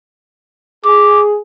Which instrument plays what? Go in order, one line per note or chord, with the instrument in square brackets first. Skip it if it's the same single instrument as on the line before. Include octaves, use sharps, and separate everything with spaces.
[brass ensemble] G#4 [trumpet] D6